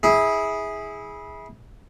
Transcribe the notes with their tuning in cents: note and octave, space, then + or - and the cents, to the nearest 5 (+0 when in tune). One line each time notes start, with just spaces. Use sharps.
E4 -25 G#4 +0